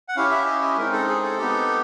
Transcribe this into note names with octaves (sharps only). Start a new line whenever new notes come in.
F#5
C#4 E4 G4 F5
E5
D#5
D#5
G#3 C4 D#4 A#4
A4
G#4
A4
B3 D#4 G4